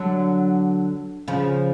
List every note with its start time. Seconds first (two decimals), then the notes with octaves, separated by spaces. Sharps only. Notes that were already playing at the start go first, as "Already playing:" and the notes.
Already playing: D3 F#3
1.28 C#3 F3